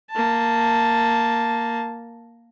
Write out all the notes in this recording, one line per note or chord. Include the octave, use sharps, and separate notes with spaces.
A#3 A5